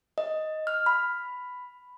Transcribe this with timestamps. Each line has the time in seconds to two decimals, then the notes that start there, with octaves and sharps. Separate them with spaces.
0.18 D#5
0.67 F6
0.86 B5